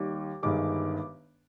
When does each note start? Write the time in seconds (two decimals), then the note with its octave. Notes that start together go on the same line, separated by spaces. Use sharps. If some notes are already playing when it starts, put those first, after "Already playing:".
Already playing: D#2 D#3 G3 D6
0.43 G1 G2 D#3 G#3 D6